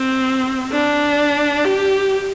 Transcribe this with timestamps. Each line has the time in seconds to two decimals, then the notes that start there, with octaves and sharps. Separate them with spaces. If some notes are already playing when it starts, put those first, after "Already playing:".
Already playing: C4
0.72 D4
1.65 G4